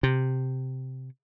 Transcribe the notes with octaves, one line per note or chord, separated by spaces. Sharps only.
C3